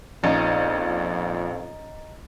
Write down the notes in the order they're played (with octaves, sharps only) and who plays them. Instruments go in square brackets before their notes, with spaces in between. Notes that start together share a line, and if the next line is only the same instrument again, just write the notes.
[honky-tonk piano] A#1 [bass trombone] F2 [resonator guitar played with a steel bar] C#4 D#4 [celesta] D#5 A#5